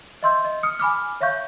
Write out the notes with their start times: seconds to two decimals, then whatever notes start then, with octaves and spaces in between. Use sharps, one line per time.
0.23 D#5 E5 C6 E6 G6
0.44 D#5
0.63 D#6 F6 C#7
0.79 G#5 B5 D6 F6
1.21 C#5 E5 F5 C#6 G6